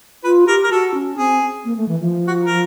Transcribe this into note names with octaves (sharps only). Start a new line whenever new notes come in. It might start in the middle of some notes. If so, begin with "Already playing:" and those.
F4 B4
G4 A#4
A#4
F#4 A4
C#4
C4 G#4
A#3
A3
E3
F3
F#4
A#4